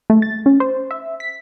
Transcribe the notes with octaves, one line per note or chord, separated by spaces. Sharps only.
A3
A6
C#4
C5
E5
B6